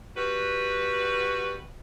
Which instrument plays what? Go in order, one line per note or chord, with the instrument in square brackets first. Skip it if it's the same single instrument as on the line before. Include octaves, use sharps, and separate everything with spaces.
[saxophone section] G3 F#4 B4